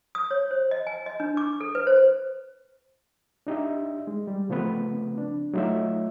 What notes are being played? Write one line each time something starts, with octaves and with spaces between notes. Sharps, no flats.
D#6
C#5
C5
D#5
G#5
D#5
D4
D6
A4
B4
C5
D4 D#4 G4 E5
G#3
G3
C#3 F3 A3 B3 C4 B4
D4
F#3 A3 D#4 F4 C#5 E5